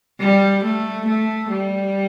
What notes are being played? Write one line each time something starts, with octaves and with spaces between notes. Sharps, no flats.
G3
A3
A3
G3